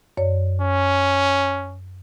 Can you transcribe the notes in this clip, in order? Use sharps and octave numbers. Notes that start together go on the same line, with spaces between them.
F#2 C#5 D5
C#4